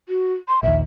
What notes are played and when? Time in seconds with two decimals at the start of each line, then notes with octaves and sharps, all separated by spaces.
0.09 F#4
0.48 C6
0.63 A#1 D#2 E5